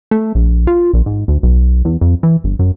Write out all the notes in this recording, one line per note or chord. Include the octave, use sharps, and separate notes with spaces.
A3
A#1
F4
A#1
G#2
D2
B1
E2
F2
E3
G1
F#2